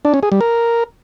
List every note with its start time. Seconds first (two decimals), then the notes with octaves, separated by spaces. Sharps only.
0.05 D4
0.14 C#4
0.23 G#4
0.32 G3
0.41 A#4